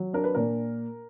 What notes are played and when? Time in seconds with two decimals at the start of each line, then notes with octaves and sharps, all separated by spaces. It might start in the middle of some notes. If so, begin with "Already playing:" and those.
Already playing: F#3
0.13 D4 A#4
0.24 B4
0.35 A#2 A#4